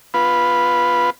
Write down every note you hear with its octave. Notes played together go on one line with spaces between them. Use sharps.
B3 F4 B4